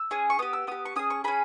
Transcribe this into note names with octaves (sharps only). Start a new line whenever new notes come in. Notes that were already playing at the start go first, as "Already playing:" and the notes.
Already playing: E6
C#4 G#4
C#6
B3 G4 D#6
E6
B3 G4 D#6
C#6
C#4 G#4 D#6
C#6
C#4 G#4 B5